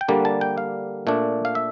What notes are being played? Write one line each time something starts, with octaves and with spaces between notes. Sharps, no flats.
G5
D3 G3 A#3 D4 A5
A5
G5
F5
A#2 A3 D4
F5
E5